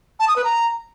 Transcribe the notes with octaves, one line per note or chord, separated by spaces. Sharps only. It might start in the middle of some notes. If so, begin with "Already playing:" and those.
A5
D#6
B4
A#5